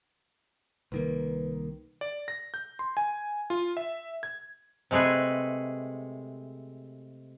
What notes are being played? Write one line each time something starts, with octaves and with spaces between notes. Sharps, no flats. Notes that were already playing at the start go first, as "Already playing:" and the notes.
C2 D#3 A#3 B4
D5
A#6
G6
C6
G#5
F4
E5
G#6
C3 G#3 A3 G#4 B4